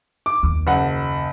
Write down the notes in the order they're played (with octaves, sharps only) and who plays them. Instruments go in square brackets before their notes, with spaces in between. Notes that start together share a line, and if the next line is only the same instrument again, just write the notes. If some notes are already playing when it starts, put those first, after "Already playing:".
[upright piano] D6
[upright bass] D#2
[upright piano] F#1 F#5